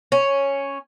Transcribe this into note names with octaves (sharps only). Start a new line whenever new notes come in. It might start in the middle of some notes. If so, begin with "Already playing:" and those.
C#4